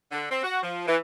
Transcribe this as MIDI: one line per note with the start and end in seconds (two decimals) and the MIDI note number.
0.12 0.29 50
0.31 0.41 60
0.43 0.62 66
0.63 0.84 53
0.87 0.96 52